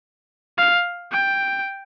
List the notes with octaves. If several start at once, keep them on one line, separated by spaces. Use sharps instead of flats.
F5
G5